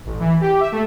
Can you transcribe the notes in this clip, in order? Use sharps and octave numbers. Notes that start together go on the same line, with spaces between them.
A1
E3
G4
E5
A3